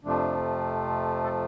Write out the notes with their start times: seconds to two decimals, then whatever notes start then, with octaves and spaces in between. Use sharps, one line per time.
0.04 F2 C3 F3 A3 D4
1.24 A4